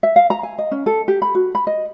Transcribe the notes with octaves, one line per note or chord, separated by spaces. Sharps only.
E5
F5
A#5
G#5
D#5
C#4
A4
G4
B5
F#4
B5
D#5